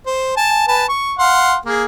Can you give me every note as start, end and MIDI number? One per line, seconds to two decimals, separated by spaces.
0.06 0.35 72
0.37 0.64 80
0.37 0.64 81
0.68 0.85 71
0.68 0.85 80
0.68 0.85 81
0.89 1.13 85
1.19 1.56 77
1.19 1.56 78
1.19 1.56 84
1.66 1.85 58
1.66 1.85 68